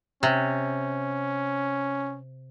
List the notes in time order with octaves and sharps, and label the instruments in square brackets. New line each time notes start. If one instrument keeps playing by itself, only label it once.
[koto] C3 [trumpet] C#4